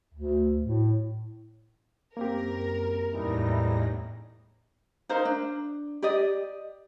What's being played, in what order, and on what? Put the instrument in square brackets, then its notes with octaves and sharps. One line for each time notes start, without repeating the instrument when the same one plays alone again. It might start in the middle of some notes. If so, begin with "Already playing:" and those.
[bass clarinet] D2
A2
[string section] F#2 A#4 [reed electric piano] A#3 C4 G4
[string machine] E2 A2 A#6 [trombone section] E3 G3 D#4
[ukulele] D#4 A#4 C5 F5
D4
G4 D5 D#5